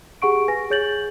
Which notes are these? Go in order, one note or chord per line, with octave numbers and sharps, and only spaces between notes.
G4 G#4 F#5 C#6 D7
B4 G#5 A#6
G#4 C#5 G6 A6 F#7